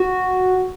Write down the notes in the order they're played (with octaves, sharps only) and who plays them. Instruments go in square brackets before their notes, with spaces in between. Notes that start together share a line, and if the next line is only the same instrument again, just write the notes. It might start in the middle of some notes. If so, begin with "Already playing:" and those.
Already playing: [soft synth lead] F#4